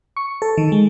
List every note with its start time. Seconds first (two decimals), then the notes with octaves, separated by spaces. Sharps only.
0.17 C#6
0.42 A4
0.58 D#3
0.72 G#3